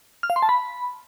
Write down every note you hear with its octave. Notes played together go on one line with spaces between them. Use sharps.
F6
F5
C6
A5
B5